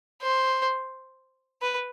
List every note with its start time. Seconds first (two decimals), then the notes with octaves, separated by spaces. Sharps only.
0.22 C5
1.62 B4